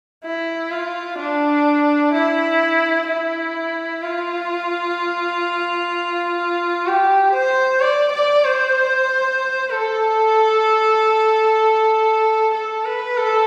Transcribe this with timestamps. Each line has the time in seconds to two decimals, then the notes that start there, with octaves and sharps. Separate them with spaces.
0.24 E4
0.71 F4
1.19 D4
2.14 E4
3.08 E4
4.03 F4
6.86 G4
7.34 C5
7.81 D5
8.13 D5
8.44 C5
9.70 A4
12.54 A4
12.85 B4
13.17 A4